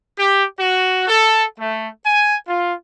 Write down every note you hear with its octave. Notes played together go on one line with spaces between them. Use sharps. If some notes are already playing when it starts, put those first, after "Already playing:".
G4
F#4
A4
A3
G#5
F4